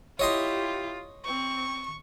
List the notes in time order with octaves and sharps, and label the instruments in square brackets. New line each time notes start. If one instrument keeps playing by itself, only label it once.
[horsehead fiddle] E4 G4 [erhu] F4 [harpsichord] C#5 D#5 C6
[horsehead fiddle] C4 [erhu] C#6